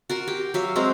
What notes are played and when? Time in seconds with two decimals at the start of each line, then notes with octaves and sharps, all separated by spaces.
0.10 F#4 A#4 C6
0.27 G4
0.54 F#3 E5 F5
0.76 G#3 C4 F#4 A#5